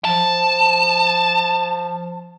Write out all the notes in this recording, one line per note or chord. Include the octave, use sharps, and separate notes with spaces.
F3 A5